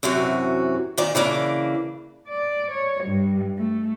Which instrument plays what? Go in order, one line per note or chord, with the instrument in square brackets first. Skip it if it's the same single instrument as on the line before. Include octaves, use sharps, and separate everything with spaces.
[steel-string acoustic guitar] F#2 C3 E3 F#4
A#2 D#3 D5
C#3 E3 A#3 D4
[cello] D5
C#5
G2
A3